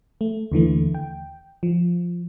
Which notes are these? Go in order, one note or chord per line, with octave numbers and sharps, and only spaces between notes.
A3
D#2 D3 E3 A3
G5
F3